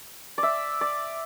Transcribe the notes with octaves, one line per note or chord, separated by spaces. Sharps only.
D5
E5
D5